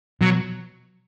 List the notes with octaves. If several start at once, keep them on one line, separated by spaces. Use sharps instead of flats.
B2 F#3